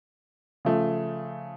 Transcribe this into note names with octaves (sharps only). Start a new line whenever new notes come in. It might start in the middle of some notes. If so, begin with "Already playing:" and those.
C#3 F3 A3